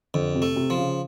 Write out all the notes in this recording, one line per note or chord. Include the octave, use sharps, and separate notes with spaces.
F2 D3
C3
A3
C3
F3
C#3